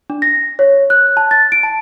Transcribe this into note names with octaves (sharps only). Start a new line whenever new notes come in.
D4
A#6
C#5
F#6
A5
A6
D7
A5